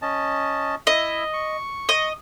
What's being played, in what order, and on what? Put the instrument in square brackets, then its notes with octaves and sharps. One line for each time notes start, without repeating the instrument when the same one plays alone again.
[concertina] C#4 D#5 A5
[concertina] E4 E5 [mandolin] D#5
[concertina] C#6
[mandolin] D#5